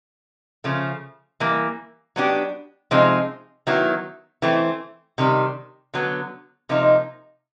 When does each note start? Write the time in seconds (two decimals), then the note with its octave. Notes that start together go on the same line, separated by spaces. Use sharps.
0.64 C#3 F3 A3
1.40 E3 G3 A#3
2.16 F#3 B3 D4 G4
2.91 C3 F3 G#3 C4 D#4
3.67 D#3 F#3 B3 E4
4.42 E3 A3 C4
5.18 C3 D#3 G3
5.94 D3 F#3 B3
6.69 C3 F3 A#3 D#4